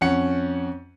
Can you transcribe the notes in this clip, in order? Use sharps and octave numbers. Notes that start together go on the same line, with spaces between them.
F2 C#4 F#5 C#7